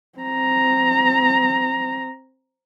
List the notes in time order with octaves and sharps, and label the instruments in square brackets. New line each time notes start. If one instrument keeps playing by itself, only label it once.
[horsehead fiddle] C4 A#5